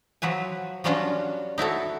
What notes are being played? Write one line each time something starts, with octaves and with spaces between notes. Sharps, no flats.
F3 F#3 B4 G#5
F#3 G3 C#4 D4 F4 F#4
D#4 E4 F#4 A4